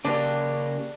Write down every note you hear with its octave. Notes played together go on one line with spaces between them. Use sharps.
C#3 A#3 D4 G4